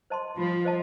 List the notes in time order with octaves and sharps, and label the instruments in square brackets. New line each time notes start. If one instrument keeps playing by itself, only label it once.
[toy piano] C5 D#5 A5 C6
[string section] F3 [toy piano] F4
[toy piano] C5 D#5 A5